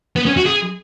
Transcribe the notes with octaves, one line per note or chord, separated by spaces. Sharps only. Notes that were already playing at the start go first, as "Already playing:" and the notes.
B3
C#4
F#4
G#4